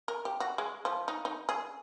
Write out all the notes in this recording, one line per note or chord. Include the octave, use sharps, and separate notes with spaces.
A#4
G4
F#4
G#3
F3
D#4
D#4
G#4